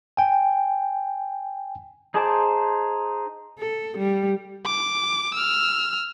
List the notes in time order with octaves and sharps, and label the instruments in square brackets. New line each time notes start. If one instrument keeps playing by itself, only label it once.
[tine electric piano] G5 G#5
[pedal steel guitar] D#4 G#4 C5 A5 D6
[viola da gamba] A4
G3
[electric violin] D6
E6 F6